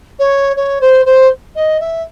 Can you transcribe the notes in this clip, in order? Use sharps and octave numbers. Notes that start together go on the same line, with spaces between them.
C#5
C#5
C5
C5
D#5
E5